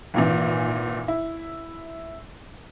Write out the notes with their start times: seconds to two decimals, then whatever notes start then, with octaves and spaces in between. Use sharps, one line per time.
0.14 G#1 A#2 E3
1.08 E4